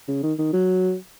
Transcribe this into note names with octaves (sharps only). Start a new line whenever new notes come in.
C#3
D#3
D#3
F#3